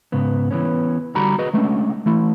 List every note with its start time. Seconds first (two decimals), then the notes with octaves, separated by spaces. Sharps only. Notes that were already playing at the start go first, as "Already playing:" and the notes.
0.12 G#2 C#3 B3
0.51 E3 B3 C#4
1.15 D3 G3 F#4 A#5 B5
1.39 F#4 G#4 B4 D#5
1.54 G#3 A3 C#4 D4
2.06 E3 A3 E4